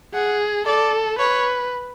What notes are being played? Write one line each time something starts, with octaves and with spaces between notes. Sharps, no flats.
G#4 F#5
A4 D5
B4 C#5